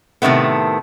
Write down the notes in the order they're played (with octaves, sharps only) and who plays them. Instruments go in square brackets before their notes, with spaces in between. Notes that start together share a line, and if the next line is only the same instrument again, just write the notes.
[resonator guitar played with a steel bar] A2 C3 D#3 A3 B3